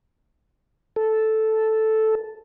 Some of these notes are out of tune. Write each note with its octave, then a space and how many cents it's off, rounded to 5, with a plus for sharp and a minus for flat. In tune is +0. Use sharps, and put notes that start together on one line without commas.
A4 -5